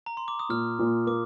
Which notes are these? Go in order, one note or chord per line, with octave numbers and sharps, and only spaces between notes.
A#5
C6
D6
D#6
A#2 F6
A#2
A#3 D6